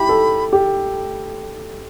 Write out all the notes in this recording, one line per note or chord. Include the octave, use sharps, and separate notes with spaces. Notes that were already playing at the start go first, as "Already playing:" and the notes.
Already playing: E4 G4 B5
A4
G4